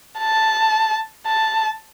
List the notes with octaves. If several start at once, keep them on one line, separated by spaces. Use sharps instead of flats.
A5
A5